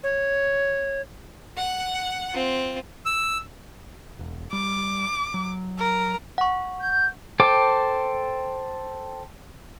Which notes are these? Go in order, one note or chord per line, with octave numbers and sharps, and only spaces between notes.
C#5
F#5
C4 F4
E6
E1
G3 D6
F#3
A#4
F#5 C#6
G6
A4 C5 G5 D6